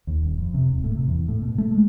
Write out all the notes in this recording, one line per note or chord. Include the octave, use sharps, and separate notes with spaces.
D#2
D#1
F2
C3
D#1
A2
C3
E2
A2
B2
A3
G#3